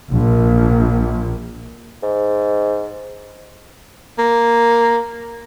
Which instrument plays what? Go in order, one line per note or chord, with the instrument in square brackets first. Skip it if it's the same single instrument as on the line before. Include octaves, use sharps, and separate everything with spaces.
[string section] A#1
[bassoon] G#2
[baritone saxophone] A#3